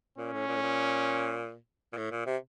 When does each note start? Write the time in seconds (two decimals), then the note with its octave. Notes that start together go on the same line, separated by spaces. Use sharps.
0.18 A#2 C#4
0.33 A2
0.47 A#2
0.56 A2
0.62 A#2
1.93 A#2
1.97 A2
2.11 A#2
2.26 C3